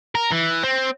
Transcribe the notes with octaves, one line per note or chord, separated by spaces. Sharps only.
A#4
E3
C4